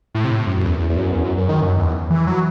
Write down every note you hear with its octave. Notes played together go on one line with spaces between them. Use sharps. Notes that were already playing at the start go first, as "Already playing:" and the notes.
A2
C3
A2
F#2
F#2
E2
E2
E2
F#2
E2
F#2
F#2
D#3
F#2
E2
E3
F#3